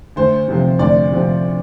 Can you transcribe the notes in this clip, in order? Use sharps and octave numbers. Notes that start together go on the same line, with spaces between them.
D2 C5
C3 F3 C4
D2 D5
C3 F3 C4